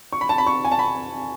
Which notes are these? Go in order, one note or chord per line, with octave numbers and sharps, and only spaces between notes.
C#6
B5
A5
B5
C#6
G#5
A5
B5